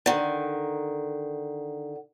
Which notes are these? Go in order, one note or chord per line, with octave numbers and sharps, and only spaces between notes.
D3 D#3